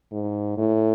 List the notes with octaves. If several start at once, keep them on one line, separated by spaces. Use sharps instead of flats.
G#2
A2